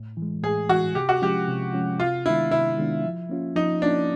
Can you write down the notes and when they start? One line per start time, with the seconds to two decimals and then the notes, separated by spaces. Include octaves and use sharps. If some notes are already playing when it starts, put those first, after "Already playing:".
Already playing: A2
0.17 E3
0.22 G#3
0.43 A2 G#4
0.69 E3 G#3 F#4
0.95 C3 G4
1.09 F#4
1.21 F3 G#3 C#4 F4 G4
1.48 C3
1.73 F3 G#3 C#4 F4
1.99 C3 F4
2.26 D#3 G#3 B3 D4 E4
2.51 C3 E4
2.77 D#3 G#3 B3 D4
3.04 F3
3.29 A#3 C#4 F4
3.56 F3 D#4
3.82 A#3 C#4 D4 F4